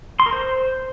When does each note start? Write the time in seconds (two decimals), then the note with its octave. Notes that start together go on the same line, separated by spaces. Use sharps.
0.20 C6
0.26 A#4
0.33 C5